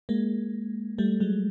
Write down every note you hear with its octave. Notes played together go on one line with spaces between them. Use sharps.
G#3 A#3
G3 A3
F#3 G#3